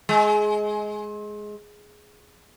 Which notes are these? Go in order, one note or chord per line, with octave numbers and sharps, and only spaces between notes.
G#3